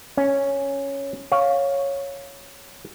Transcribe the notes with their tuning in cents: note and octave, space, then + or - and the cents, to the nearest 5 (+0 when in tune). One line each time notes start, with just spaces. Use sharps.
C#4 +0 G#5 +20
C#5 +0 F5 +10